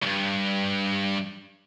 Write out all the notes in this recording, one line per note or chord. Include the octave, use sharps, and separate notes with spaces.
C#2 G2